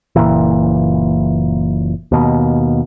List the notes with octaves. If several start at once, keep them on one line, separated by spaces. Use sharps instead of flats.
F#1 A#2 E3
D#2 B2